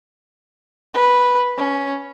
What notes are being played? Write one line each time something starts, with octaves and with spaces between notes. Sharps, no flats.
B4
C#4